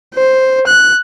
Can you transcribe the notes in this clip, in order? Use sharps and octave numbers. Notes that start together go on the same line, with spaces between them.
C5
F#6